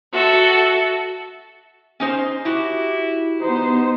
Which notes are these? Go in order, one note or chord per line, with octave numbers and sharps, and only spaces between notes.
F#4 A4 E5
C#4 D#4 C5
E4 F#4 G4
B3 D#4 C5